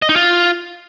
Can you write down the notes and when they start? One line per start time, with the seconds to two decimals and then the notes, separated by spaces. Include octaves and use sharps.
0.02 D#5
0.09 D#4
0.16 F4